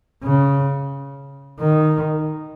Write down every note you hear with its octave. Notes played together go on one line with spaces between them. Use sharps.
C#3
D#3